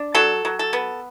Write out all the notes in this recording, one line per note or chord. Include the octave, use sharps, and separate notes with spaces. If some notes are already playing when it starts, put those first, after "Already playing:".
Already playing: D4
F#3 A4
F#3
A4
B3